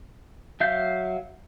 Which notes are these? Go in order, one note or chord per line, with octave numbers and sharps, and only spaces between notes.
F#3 E5 F5 G6